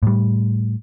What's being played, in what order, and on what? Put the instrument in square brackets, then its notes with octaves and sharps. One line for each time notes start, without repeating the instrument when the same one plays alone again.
[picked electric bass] A2 G3